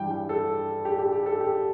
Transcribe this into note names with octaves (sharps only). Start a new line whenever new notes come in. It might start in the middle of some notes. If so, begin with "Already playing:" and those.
Already playing: G2 E3 G3 G5
G5
A4
G4
G4
G4
A4
G4